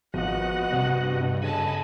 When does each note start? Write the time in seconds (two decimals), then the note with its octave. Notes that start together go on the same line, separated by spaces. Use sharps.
0.14 G#1 F3 B3 F#4 D#5 F#5
0.72 G2 C3
1.42 C#3 A4 D#5 G#5 A5 B5